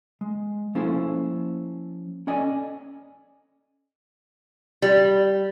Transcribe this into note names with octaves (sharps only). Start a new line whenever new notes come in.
G#3
F3 A#3 C#4 E4 A4 C5
C#4 A4 D5 D#5 G#5
G3